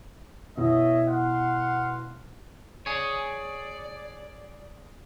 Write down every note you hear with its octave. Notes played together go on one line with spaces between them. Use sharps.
B2 E4 C#5 D#5 E5
F5 F#5 C6
G#4 C#5 D5